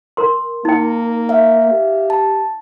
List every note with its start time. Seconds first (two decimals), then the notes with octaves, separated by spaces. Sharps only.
0.17 A#4 C6
0.65 A#3 D#4 G5
1.29 E5 F5
1.71 G4
2.10 A5